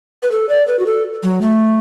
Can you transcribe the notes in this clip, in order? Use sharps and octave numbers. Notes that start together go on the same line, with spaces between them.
B4
A4
D5
B4
F#4
A4
F#3
A3